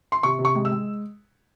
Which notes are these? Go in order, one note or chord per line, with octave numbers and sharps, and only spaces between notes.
C6
C3 C#6
C3
C#6
G#3
E6
G#3